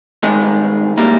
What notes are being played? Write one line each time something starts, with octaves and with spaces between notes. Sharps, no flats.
G2 D#3 G#3
G3 A#3